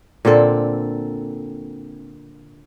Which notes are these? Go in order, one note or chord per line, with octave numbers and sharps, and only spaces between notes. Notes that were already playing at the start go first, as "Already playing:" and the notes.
A#2 D3 C4 A4